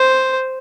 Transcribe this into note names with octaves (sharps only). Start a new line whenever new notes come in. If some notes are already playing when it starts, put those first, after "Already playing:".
Already playing: C5